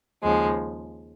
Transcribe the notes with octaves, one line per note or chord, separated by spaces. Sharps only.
D#2 C#3 F3 G#3